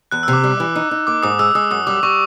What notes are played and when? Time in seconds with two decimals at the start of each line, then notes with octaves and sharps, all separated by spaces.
0.11 E2 F#6
0.23 E6
0.28 C3
0.33 D6
0.44 G3
0.60 E3
0.75 D#4
0.91 D#4
1.07 A#3 D6
1.23 G#2 D#6
1.39 G#3 E6
1.55 G#3 D#6
1.71 F#2 D#6
1.87 G3 D6
2.03 G3 C#6